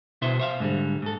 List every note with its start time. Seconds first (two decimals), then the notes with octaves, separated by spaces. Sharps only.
0.22 B2 E4 B4 C5 E5 C6
0.40 C5 E5 F5
0.60 G#2 D3 G3
1.02 G#2 A4